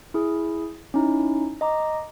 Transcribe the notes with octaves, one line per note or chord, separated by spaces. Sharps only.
E4 G#4
C#4 D#4 E4
D#5 A#5 D6